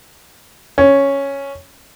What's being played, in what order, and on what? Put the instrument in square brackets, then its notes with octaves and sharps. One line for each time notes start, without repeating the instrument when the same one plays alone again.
[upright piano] C#4